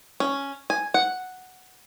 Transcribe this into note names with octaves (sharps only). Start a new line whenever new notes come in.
C#4
G#5
F#5